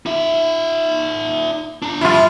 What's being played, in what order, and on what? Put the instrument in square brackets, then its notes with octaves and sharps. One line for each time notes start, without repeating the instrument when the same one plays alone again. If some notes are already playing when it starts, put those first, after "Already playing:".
[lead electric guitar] D#4 E5
D4 A#5
[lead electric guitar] G2 F3 [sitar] E4 F4